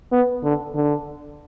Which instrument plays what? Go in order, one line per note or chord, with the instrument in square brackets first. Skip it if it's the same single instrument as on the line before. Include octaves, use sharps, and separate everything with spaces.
[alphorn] B3
D3
D3